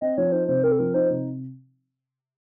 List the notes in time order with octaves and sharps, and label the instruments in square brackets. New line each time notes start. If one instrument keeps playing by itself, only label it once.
[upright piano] C4 [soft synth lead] D#5
[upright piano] F3 [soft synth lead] C#5
[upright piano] D#4 [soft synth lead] C5
[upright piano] C3 [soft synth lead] C5
[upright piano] C4 [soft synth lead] A#4
[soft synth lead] A4
[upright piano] F3 [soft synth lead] A#4
[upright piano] D#4 [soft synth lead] C5
[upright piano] C3